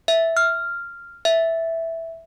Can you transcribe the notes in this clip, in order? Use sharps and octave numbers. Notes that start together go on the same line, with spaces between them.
E5
F6
E5